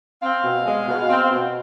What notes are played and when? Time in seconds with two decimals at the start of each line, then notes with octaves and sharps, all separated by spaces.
0.23 C4 F5
0.44 B2
0.66 G#3
0.88 B2
1.10 C4
1.31 B2